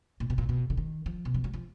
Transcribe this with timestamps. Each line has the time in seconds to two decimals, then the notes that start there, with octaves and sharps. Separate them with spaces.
0.20 A#2
0.30 B2
0.38 A#2
0.49 B2
0.70 D3
0.77 D#3
1.06 F3
1.25 B2
1.34 F3
1.44 F#3
1.54 F3